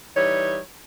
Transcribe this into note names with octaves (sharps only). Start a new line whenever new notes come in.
E3 G3 D#4 C#5